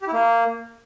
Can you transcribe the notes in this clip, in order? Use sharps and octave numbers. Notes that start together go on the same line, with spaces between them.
G4
E4
A#3